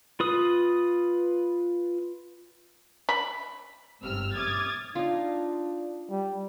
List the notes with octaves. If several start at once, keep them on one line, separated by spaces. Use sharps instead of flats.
F4 B4 D#6
B5
G1 G#2 C3 E6 F6
D6 D#6 F6 G#6 A6
D4 D#4 F4
G3